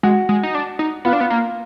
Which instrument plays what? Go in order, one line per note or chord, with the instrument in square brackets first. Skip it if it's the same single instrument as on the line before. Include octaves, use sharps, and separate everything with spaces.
[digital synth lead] G#3 [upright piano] F#4
[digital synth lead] G#3
D#4
D4
D#4
[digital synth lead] B3 [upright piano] F4
[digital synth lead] D4
B3
A#3